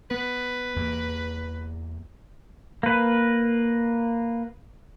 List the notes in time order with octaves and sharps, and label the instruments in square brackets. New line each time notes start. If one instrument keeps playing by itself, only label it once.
[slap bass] B3 [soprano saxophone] B4
[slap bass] E2 A#3
[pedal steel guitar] A#3 B4